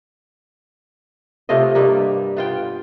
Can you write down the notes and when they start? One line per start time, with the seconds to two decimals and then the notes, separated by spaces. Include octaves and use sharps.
1.49 C3 A3 F4 D#5
1.75 G2 G3 A#3
2.37 B3 F4 G5